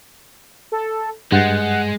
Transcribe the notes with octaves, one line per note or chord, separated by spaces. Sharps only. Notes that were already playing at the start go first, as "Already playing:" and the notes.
A4
G2 G#3 F#5 G6 A6